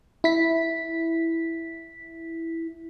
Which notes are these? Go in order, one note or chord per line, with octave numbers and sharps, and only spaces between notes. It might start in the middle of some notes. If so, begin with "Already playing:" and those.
E4 B6